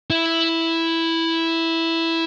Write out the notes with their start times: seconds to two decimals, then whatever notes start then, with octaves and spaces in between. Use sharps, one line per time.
0.10 E4